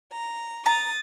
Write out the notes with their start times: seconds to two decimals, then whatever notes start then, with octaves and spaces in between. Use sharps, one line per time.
0.12 A#5
0.66 A#5 D#6 A6